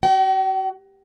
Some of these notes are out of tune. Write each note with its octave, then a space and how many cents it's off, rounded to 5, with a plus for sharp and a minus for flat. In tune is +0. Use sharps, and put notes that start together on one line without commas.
F#4 +30 G5 -45